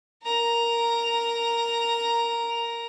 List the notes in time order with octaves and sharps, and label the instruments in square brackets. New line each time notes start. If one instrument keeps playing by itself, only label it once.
[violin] A#4 A#5